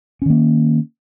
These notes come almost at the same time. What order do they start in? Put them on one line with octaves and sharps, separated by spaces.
C#4 D#3 A#3